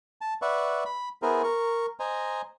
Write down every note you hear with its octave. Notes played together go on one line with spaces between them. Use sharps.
A5
B4 D5 E5 F#5 C#6
B5
B3 E4 G#4 A#4 C5
A#4 C#6
C5 D#5 G#5 A#5